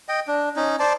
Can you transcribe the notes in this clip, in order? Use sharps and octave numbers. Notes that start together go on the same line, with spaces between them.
D#5 G5
D4
C#4 D#4
C5 D5 A5